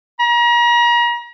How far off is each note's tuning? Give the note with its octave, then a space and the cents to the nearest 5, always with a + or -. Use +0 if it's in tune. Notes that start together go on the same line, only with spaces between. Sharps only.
A#5 +40